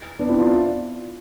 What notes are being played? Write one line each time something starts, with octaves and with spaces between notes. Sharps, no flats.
B3 D4
C4 E4
D4 F4